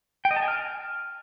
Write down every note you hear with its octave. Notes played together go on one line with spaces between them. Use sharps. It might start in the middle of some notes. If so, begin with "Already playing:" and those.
G5
D#5
A5
G#5
F6